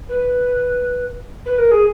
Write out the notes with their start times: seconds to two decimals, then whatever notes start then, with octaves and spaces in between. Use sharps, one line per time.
0.09 B4
1.46 B4
1.58 A#4
1.71 G#4